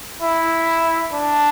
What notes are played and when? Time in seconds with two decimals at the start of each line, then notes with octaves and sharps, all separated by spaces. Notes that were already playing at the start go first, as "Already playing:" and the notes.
0.22 E4
1.13 D4